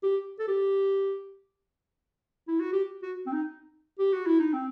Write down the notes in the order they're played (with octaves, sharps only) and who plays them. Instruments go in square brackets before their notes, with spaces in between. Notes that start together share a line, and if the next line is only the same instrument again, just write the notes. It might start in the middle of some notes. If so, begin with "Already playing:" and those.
[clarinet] G4
A4
G4
E4
F#4
G4
F#4
C4
D#4
G4
F#4
E4
D#4
C4